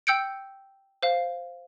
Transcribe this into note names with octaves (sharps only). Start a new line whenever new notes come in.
G5 E6 G6 C#7 D7
C5 F5